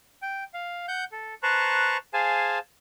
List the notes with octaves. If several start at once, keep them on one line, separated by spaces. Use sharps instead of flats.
G5
F5
F#5 G6
A4
B4 C5 A5 A#5 C#6 F#6
G#4 C5 F5 G#5 A5